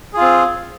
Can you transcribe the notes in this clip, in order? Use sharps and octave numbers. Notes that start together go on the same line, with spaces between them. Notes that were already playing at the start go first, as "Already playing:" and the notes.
C4 F4 G#4